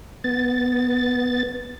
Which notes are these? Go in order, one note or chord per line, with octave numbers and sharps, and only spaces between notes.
B3 A6